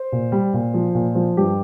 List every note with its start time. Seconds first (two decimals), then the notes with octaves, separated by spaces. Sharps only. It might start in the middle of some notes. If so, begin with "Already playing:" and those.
Already playing: C5
0.12 A#2
0.32 G3
0.53 A#2
0.74 F3
0.94 A#2
1.15 F3
1.37 G2 G4